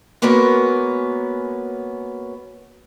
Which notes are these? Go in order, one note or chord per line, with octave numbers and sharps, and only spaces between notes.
G#3 A#3 B3 C#4 F#4 A#4